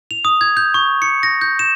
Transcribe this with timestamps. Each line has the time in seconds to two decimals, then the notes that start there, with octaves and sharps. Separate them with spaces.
0.11 F7
0.25 D#6
0.41 G#6
0.57 G6
0.74 C#6
1.02 C#7
1.23 A#6
1.41 G6
1.59 E7